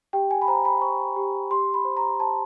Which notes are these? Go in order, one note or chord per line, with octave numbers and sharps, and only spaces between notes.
G4 G5
G#5
B5
C5 A#5
B5
C5 C#6
G4
G4 C6
B5
C5
A#5
C5 A5